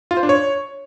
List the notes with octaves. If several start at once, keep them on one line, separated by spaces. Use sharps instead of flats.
F4
C5
D4
C#5